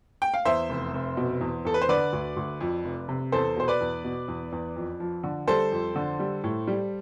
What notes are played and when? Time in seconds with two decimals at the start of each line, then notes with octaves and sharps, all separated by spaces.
0.22 G5
0.34 F5
0.45 E2 C5 E5
0.69 F1
0.94 F1
1.17 B2
1.41 E2
1.65 E2 A4
1.74 B4
1.82 C5
1.89 D3 B4 D5
2.13 D2
2.37 D2
2.61 F2
2.84 F1
3.09 C3
3.32 E2 A4 C5
3.56 B2 C5
3.68 B4 D5
3.80 E2
4.04 B2
4.28 E2
4.52 E2
4.76 F2
5.00 F3
5.24 D3
5.48 G3 A4 C5
5.72 F2
5.96 D3
6.19 G3
6.44 A2
6.68 G3